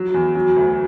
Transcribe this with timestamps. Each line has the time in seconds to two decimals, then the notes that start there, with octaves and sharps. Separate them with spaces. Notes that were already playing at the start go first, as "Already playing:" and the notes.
Already playing: F#3
0.14 E2
0.35 F#3
0.56 D2